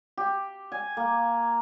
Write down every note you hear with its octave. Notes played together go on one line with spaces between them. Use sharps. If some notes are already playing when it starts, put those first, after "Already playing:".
G4
G#5
A#3